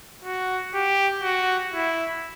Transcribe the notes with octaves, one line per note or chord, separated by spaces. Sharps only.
F#4
G4
F#4
E4